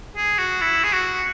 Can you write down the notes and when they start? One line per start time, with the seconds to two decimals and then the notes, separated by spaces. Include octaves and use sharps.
0.16 G#4
0.38 F#4
0.62 E4
0.84 G#4
0.93 F#4